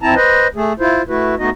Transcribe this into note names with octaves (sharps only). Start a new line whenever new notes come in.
F2 C4 E4 A5 A#5
B4 C5 D#5
A3 G#4
E4 F4 C5
A3 E4 F#4 B4
A3 B3 D#4 F#4 D#5